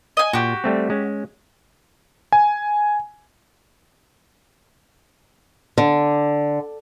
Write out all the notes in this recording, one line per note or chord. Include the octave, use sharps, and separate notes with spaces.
D#5 G#5
A#2 F#4 G4
G3 A3 C4
G#3 C#4
G#5
D3